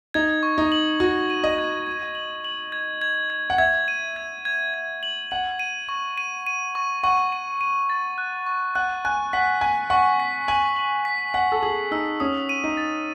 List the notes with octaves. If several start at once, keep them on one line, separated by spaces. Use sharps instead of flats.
D#4 G#6
C#6
D#4
F#7
F#4 C#6
D#7
D#5
G#6
G#6
F#7
F#7
G#6
G#6
G#6
F#5
E5 G#6
D#7
G#6
G#6
G#6
F#7
F#5 F#7
D#7
C#6
D#7
D#7
C#6
F#5 C#6
D#7
D#7
A6
F#6
C#6
F#5 F#6
G#5 F#6
F#5 B6
G#5 B6
F#5 C#6
B6
G#5 F#7
F#7
B6
F#5 B6
A4
G#4 F#7
D#4 E6
C#4 D#6
D#7
D#4
A6